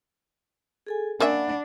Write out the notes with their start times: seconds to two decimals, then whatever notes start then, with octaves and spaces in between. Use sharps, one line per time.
0.87 G#4 A4 G#5
1.20 A#3 C#4 D4 D5 E5 F#5 B5